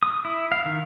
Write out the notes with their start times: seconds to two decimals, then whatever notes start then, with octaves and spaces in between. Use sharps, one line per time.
0.03 D#6
0.25 E4
0.52 F5
0.66 D#3